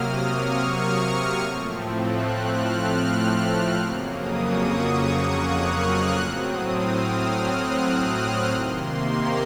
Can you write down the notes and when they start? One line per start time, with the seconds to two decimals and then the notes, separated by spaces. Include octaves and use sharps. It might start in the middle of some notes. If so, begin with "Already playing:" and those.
Already playing: C3 F#3 A#3 D#6 F6
0.20 C#6
0.81 F6
1.39 A2 F3 A3 C4
1.99 F#6
2.29 F6
3.76 F2 C#3 F#3 A#3 C#6
4.07 D#6
4.35 C#6
4.94 D#6
5.25 F#6
5.55 F6
6.13 A2 F#3 C4 F#6
6.43 D#6
6.72 F6
7.32 F#6
7.92 F#6
8.20 F6
8.51 C3 D#3 A#3 C6
9.10 A#5